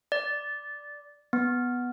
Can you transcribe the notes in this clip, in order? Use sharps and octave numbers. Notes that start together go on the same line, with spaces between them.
D5
B3